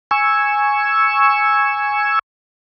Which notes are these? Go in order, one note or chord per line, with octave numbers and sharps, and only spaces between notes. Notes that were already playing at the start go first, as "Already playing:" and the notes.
G#5 C#6 E6